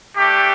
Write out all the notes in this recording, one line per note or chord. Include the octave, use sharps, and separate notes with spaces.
A3 D4 G4